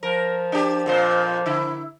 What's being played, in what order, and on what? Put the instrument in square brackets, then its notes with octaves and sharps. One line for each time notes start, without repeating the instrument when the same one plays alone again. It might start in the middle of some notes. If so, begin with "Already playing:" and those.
[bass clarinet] F3 [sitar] A#4
[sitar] D4 G4
F2 A#2 C5
D3 E4